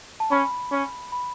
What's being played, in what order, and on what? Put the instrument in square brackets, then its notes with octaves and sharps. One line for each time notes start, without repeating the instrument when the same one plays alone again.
[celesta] A5
[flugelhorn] C#4 [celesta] B5
[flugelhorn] C#4
[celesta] B5